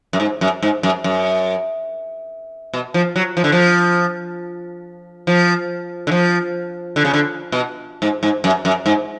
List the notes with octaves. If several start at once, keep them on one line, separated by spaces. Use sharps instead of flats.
F#2
G#2
F#2
G#2
F#2
F#2
B2
F3
F#3
F3
D3
F3
F3
D3
F3
D3
C#3
D3
B2
G#2
G#2
F#2
F#2
G#2